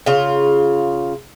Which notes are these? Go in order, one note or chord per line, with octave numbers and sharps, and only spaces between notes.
C#3 F4